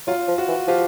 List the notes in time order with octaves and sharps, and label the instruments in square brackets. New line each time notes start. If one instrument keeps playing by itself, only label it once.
[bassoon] F#3 [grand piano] F4
[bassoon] F3
[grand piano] F#4
[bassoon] E3
[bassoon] F3 [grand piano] F4 G4